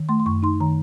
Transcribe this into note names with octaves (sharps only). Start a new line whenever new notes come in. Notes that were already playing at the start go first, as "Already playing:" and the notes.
Already playing: D#3
A3 C6
C6
F#2 C#6
D#4 C6
D#3 A#5